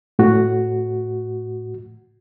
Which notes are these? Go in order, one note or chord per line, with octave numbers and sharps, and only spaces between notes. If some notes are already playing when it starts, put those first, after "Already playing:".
A2 F#4